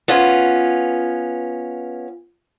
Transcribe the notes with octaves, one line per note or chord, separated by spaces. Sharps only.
B3 C#4 F4